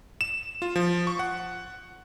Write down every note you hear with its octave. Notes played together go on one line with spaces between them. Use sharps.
E7
F4
F3
C#6
F#5